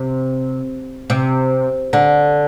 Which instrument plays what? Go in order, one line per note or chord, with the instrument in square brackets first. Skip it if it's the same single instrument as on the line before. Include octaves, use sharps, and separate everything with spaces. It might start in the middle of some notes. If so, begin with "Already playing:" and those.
Already playing: [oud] C3
C3
D3